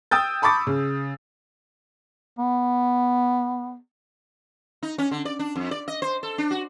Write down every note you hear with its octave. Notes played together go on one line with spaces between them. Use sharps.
G5 D#6 E6 G6 A6
A5 B5 C#6 D6 A6
C#3
B3
D#4
C#4
D3
D5
D4
F2
D5
D#5
C5
A4
D4
F#4